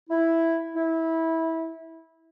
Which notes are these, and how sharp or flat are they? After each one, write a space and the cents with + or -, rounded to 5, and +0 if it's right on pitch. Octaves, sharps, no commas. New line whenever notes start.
E4 +0
E4 -20